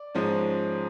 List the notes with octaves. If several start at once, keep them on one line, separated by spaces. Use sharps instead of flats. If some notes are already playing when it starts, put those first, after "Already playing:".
Already playing: D5
G#2 F3 G#3 C#4